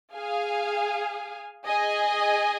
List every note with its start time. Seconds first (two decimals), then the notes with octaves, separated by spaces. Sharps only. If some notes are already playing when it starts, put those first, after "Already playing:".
0.15 G#4 F5 G#5
1.66 G#4 D#5 G#5